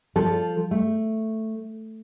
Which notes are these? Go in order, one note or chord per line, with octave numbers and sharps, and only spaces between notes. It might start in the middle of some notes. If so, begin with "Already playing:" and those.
F3 A4
A3